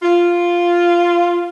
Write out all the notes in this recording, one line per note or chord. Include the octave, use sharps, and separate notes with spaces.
F4